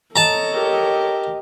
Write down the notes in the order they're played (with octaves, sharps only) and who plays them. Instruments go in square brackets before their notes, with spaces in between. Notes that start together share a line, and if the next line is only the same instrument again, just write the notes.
[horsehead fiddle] A4 C#5 [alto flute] D#5 [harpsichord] A5 A#5
[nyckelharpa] G4 A#4